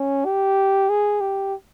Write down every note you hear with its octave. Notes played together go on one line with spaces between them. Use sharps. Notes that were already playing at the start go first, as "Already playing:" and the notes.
Already playing: C#4
G4
G#4
G4